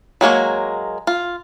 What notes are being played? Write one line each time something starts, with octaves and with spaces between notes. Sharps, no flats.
F#3 G#3 A#3 C#5
F4